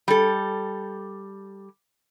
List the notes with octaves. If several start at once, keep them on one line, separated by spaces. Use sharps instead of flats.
G3 A4